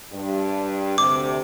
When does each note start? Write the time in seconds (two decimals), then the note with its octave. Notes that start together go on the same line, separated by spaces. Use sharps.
0.13 G2
0.98 D2 C3 D6